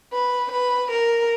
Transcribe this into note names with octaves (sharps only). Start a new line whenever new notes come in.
B4
B4
A#4